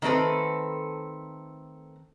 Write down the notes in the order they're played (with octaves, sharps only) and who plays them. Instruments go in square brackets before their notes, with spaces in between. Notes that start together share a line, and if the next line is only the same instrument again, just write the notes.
[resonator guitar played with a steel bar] D#3 A3 C4 A4 B4